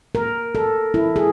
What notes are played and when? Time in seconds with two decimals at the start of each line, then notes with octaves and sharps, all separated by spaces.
0.15 A#4
0.55 A4
0.94 E4
1.16 G#4